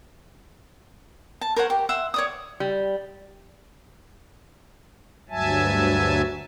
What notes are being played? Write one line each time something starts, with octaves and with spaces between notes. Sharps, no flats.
A5
A#4 C5 C#5 F#5
G4
E5 F#5 C6
C#5 D5 D#6
G3
D2 G2 F#3 E5 G#5 A5